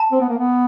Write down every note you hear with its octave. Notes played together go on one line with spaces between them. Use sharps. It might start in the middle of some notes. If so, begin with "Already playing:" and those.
Already playing: A5
C4
B3
A#3
B3